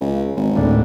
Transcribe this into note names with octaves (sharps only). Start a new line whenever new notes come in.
C#2
G#1
D2 A2 D4